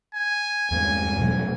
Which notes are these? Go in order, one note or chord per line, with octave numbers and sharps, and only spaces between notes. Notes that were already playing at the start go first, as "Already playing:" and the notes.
G#5
E2 G2 G#3
B2 F#3 A3